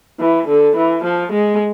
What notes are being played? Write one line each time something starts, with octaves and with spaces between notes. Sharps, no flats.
E3
D3
E3
F3
G#3